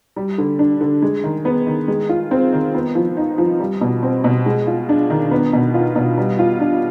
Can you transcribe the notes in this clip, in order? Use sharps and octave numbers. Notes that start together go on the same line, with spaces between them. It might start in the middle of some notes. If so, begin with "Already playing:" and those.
G3
D3
D4
D3
G#3
D#3
B3
D#3
G#3
F4
C4
D#3
B3
F3
D#4
F3
G3
B2
C4
B2
G#3
F4
D4
D#3
B3
B2
F4
B2
G3
F4
D4